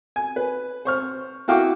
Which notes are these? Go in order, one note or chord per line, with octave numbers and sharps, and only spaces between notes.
G#5
B4
C5 C#6 F6
E4 F#4 F5 G5 C#6 D6